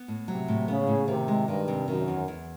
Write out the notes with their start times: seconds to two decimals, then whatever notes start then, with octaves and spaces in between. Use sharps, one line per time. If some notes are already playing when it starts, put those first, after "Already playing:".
Already playing: B3
0.08 A2
0.28 C3 F#3
0.48 A2
0.68 C#3 B3
0.87 A2
1.08 C3 D#3
1.28 G#3
1.48 G2 D#3
1.68 C3
1.88 F#2 D#3
2.08 E2
2.28 E2